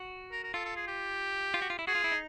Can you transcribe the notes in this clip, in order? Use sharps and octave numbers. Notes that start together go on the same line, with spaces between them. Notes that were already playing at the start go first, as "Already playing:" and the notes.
Already playing: F#4
A#4
A#4
F4 A4
A4
G#4
G4
F4
F#4
F4
E4
F#4 G#4
F4
E4
D#4